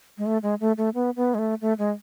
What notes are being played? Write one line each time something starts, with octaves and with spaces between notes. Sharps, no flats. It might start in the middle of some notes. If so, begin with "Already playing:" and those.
G#3
A3
G#3
A3
A3
B3
B3
G#3
A3
A3
G#3